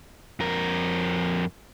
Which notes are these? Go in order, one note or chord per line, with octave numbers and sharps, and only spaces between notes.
F2 A#4